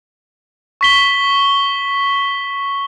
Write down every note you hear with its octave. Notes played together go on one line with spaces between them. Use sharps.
C#6 B6 G7